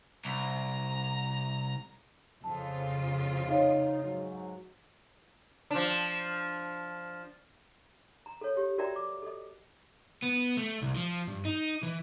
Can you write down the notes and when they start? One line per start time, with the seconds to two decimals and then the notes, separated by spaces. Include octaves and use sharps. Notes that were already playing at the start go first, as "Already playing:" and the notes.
0.25 C2 A#5
2.44 F2 C#3 F4 A5
3.48 D#4 C#5 F5
4.02 G#2 F#3
5.71 F3 D4
8.26 A#5
8.41 A4 C#5
8.56 G4 C#5
8.78 F#4 A#4 D5 E5 G5 A#5
8.96 D6
9.22 A4 D#5
10.22 B3
10.57 A3
10.82 C2
10.96 F3
11.27 G2
11.45 D#4
11.83 E3